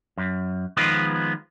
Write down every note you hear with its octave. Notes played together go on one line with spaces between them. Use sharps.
F#2
D#3 F3 G#3 B3 B4